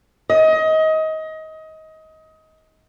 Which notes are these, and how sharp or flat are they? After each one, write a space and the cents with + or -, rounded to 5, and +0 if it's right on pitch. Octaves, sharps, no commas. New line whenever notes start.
D#5 +25